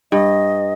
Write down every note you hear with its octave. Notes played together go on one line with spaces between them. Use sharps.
G2 D#5